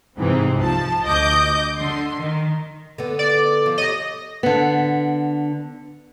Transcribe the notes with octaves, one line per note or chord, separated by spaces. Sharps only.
G#2 C3 E3 C4
C2 F3 A5
D2 D#5 D6 G6
D3 C6
D#3
D3 B3
D5
F3
G4 C#5 D#5
D3 B3